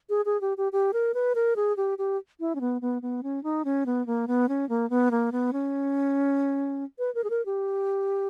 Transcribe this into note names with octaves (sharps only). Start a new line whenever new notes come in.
G#4
G#4
G4
G4
G4
A#4
B4
A#4
G#4
G4
G4
E4
C#4
B3
B3
B3
C#4
D#4
C#4
B3
A#3
B3
C#4
A#3
B3
A#3
B3
C#4
B4
A#4
G#4
A#4
G4